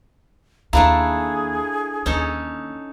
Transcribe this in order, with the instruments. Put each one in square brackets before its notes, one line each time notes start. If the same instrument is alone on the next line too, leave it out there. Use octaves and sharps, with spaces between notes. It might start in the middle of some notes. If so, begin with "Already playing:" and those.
[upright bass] D#2 [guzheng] A3 D4 E4 [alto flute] G#4 [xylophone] F5 A#5
[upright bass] D#2 [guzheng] C#4 D#4 A4